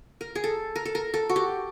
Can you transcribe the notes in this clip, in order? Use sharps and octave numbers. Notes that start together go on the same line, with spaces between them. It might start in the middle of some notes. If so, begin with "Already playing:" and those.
A#4
G#4
A4
A#4
A4
A#4
A4
F#4
G4